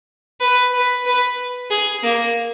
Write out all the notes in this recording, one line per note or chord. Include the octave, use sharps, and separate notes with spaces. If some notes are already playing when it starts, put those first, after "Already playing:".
B4
B4
B4
G#4
A#3